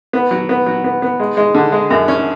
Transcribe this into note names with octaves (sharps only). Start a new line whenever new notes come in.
B3
F#3
B3
F#3
B3
B3
G#3
G#3
D3
G#3
F#2
C#4